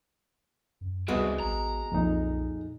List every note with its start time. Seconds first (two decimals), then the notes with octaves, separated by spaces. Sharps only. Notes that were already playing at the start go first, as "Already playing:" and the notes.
0.81 F#2
1.08 C#2 G3 G#3 B3 C4 F#4
1.40 A1 A#5
1.92 B1 F2 A#2 D#4